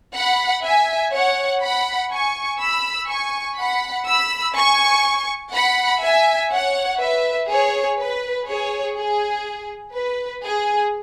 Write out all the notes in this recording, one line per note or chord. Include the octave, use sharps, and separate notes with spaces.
F#5 B5
E5 G#5
C#5 F#5
F#5 B5
G#5 C#6
B5 E6
G#5 C#6
F#5 B5
B5 E6
G#5 C#6
F#5 B5
E5 G#5
C#5 F#5
B4 E5
G#4 C#5
B4
G#4 C#5
G#4
B4
G#4